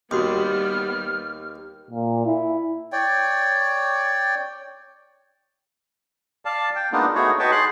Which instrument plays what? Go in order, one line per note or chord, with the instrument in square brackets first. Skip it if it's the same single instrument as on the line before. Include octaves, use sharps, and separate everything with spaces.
[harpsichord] D#2 [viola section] G3 B3 [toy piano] F#4 C6 D#6 [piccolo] F6
[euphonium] A#2
E4
[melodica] C#5 D5 G5
[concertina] D5 F5 A5
G5
G#3 A#3 B3 D4 D#4 F4
A3 B3 D#4 F#4 G#4 C#5
D#4 F#4 B4 C#5 G5 A5
G#4 C6 F#6